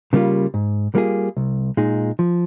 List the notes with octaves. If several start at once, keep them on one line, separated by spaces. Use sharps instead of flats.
C#3 G3 A#3 F4
G#2
G3 A#3 F4 G#4
C2
A#2 G#3 D#4 G#4
F3